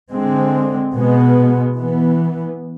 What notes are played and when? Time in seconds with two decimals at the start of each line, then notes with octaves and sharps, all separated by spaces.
0.11 D3 G#3 C4
0.94 B2 G#3 B3
1.76 E3 B3